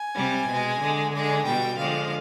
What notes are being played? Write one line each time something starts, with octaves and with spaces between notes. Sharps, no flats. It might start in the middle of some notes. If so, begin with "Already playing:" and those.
Already playing: G#5
C3 G3
B2 G#3
D3 G#3
D3 G#3 G#5
B2 G3 G5
D3 F3 G#3 F5